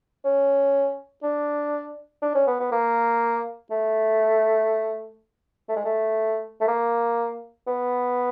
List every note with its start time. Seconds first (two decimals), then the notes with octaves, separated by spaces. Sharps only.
0.25 C#4
1.23 D4
2.22 D4
2.35 C#4
2.47 B3
2.60 B3
2.72 A#3
3.71 A3
5.69 A3
5.76 G#3
5.84 A3
6.61 A3
6.68 A#3
7.67 B3